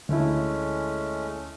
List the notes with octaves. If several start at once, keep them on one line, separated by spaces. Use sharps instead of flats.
D2 G#3 A3 C#4 E4